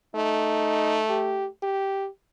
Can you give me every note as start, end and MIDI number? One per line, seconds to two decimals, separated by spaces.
0.15 1.52 57
0.15 1.02 63
1.09 1.47 67
1.63 2.08 67